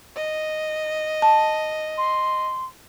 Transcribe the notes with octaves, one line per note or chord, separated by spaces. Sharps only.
D#5
A5
C6